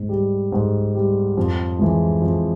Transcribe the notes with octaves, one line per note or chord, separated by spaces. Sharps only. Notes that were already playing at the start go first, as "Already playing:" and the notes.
Already playing: G#2
G3
G#2
G3
F2
E3 G#3
F2